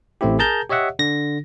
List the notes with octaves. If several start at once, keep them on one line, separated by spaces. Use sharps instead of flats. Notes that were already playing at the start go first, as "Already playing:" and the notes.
A1 A3 C4 E4 G4
G#4 A#4 A5 A#5 G6
G4 C#5 D#5 E5 F#5
D3 A#6